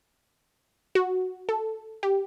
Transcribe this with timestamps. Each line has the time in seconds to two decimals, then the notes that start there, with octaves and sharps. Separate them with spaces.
0.95 F#4
1.49 A4
2.03 G4